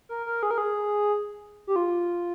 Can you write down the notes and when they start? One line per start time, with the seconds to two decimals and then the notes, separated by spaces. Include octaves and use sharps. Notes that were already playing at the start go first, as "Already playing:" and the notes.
0.09 A#4
0.26 A#4
0.43 G#4
0.51 A#4
0.58 G#4
1.67 G4
1.76 F4